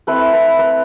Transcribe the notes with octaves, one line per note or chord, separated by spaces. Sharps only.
A3 C4 E4 B4
B4
B4